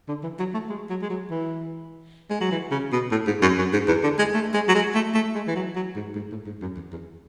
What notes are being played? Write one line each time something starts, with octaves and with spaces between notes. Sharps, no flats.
D3
E3
F#3
A3
G#3
F#3
G#3
F#3
E3
G#3
F#3
E3
C#3
B2
A2
G#2
F#2
F#2
G#2
E2
D3
G#3
A3
G#3
F#3
G#3
A3
A3
G#3
E3
F#3
F#3
G#2
G#2
A2
G#2
F#2
E2
E2